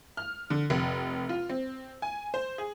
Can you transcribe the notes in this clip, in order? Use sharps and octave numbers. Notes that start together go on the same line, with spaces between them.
F6
D3
F1
F4
C4
G#5
C5
G#4